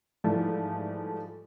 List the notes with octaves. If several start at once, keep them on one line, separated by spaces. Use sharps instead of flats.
G#2 E3 F3 G3 A3